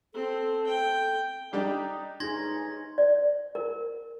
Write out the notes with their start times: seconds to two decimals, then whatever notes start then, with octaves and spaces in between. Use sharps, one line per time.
0.14 C4 A4
0.66 G5
1.53 G3 D4 D#4 G4
2.20 A1 D2 C#4 D#4 G#4 C6 G#6 A#6
2.98 D5
3.55 A#4